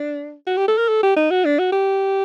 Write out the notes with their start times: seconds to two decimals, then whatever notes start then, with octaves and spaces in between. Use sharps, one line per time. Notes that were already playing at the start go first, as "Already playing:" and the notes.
Already playing: D4
0.47 F#4
0.57 G4
0.68 A4
0.78 A#4
0.88 A4
1.03 G4
1.16 D#4
1.31 F#4
1.45 D4
1.59 F#4
1.72 G4